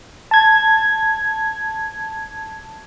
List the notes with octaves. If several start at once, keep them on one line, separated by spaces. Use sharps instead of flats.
A5 G#6